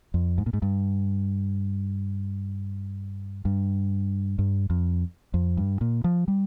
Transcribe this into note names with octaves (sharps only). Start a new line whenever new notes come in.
F2
G#2
A#2
G#2
G2
G2
G2
F2
F2
G2
A#2
F3
G3